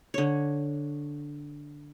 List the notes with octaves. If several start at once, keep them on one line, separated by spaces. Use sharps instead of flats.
D3 C#5